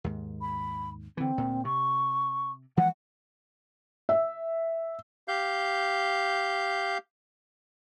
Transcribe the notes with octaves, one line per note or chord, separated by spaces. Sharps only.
D#2 G#2
B5
D3 E3 C4
D2 A#2
C3 C#6
E3 F3 G#3 F#5
E5
G4 F5 G6